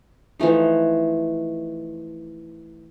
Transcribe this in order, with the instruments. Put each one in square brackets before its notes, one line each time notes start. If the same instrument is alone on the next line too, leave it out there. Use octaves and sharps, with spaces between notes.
[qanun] E3 F3 A3 D#4